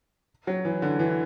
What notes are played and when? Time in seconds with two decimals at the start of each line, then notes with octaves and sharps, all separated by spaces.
0.47 F#3
0.65 E3
0.82 D3
0.99 E3